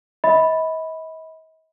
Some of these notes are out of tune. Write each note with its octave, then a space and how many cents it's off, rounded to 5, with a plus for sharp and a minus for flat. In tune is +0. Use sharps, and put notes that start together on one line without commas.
D#5 +45 B5 +0